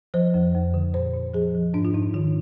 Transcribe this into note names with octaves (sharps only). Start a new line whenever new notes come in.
F3 C5
F2
F2
D3
A#2 C5
A#2
F3 G#4
F3
G#2 D4
F4
G#2 D#4
D#3 F4